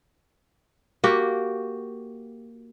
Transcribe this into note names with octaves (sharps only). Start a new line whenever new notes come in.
A#3 F#4 G4